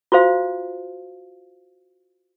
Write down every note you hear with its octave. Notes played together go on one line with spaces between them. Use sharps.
F4 F#4 C5 F5